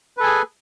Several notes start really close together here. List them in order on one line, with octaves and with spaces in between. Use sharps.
B4 A4 G#5 G#4